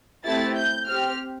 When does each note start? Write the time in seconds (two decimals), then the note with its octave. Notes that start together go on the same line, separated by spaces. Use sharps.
0.24 A3 C4 E4 G4 A6
0.56 G6
0.87 C4 G4 F6